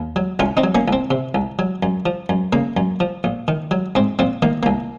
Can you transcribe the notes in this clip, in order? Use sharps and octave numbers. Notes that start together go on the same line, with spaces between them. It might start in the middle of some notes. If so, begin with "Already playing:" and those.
Already playing: D#2
F#3
C2 C#4 F4
C4 D#4
F#3
A#3 C#4
C2 C4
C3
C2
F#3
F#2
F3
F#2
C#3 A#3
F#2
F3
A#1
D#3
F#3
G#2 C4
A#1 C4
D#3 A#3
C2 A#3